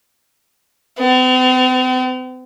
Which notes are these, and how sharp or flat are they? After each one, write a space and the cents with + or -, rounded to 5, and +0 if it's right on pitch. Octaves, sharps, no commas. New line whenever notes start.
C4 -45